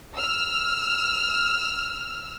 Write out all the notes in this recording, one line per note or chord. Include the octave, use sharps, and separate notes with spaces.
E6 F6